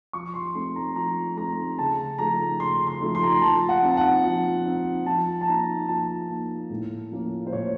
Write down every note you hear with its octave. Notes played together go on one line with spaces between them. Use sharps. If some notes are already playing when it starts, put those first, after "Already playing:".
F3 C#6
C6
A3 C4 D#4 C6
A#5
F3 A#5
A3 C4 D#4 A#5
C#3 A5
F3 A3 D#4 A#5
C#3 C6
C6
F3 A3 D#4
C6
A#5
C6
F3 A5
F#5
C4 D#4
A5
F#5
F3
C4 D#4
F3 A5
A5
A#3 D#4 A#5
F3 A5
A#3 D#4
A2
F3 A#3 C#4
C5
A2 C#5